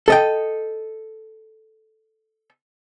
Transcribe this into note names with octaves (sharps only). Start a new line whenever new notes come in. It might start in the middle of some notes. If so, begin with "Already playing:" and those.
A4 D#5 G5